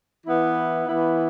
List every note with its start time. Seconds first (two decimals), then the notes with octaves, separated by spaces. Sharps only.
0.25 E3 B3 E4
0.87 E3 B3 E4